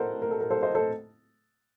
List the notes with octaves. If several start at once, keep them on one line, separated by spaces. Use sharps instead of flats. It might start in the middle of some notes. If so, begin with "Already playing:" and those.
Already playing: A2 A4 A#4 C5 D#5 F#5
A#4
A4
A#4
A4 C5
C5 D#5
A4 C5